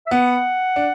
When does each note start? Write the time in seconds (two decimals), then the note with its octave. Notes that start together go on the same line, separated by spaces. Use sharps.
0.07 E5
0.11 B3 F#5
0.76 D4